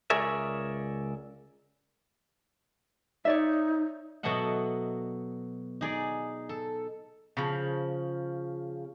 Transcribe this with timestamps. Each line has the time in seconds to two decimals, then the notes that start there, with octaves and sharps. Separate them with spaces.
0.10 C#2 G#4 A#4 C#5 D5 E5
3.25 D#4 C#5 D5 E5
4.23 B2 F#3 A4 D#5 E5 F#5
5.81 D#4 G#4 D5
6.49 A4
7.37 C#3 F3